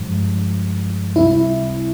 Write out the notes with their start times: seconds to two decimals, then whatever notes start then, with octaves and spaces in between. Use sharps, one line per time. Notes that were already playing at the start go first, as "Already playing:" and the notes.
Already playing: G2 F3 G#3
1.16 C#2 C3 G3 C4 E4